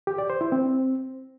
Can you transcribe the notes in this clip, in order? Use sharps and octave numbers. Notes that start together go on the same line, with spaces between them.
G4
D5
C5
E4
C4